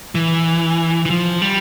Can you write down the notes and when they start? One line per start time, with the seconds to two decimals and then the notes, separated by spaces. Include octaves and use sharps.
0.15 E3
1.06 E3
1.10 F3
1.42 G3